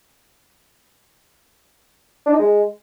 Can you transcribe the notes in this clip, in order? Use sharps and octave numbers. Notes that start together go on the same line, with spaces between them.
D4
D#4
G#3